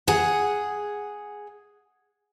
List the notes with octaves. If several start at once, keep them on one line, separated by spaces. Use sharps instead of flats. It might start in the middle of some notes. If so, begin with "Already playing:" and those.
G#4 F#5